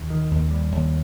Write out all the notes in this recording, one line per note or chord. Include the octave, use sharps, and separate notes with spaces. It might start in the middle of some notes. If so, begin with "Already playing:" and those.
Already playing: D#2
D#3
D#2
G3
D#2